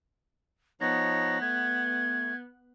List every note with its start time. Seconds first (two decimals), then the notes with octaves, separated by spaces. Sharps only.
0.81 F3 B3 D#4 C#5 A#6
1.41 A3 G#6